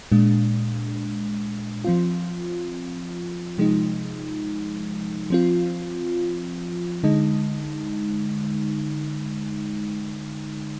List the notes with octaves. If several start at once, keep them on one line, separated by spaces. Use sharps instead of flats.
A#2 G#3 D4
F3 C4 F4
C3 F3 G#3 D#4
F3 C4 F4
D3 G#3 D#4